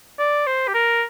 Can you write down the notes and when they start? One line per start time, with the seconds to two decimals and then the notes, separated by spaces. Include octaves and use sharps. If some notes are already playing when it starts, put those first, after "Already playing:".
0.19 D5
0.47 C5
0.68 G4
0.74 A#4